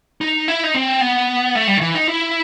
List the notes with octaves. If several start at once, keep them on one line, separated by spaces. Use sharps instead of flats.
D#4
E4
D#4
C4
B3
A3
G3
D#3
E3
D#4
E4